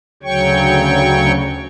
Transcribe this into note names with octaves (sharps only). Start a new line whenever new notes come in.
D2 C#3 F#3 C#5 G5 C#6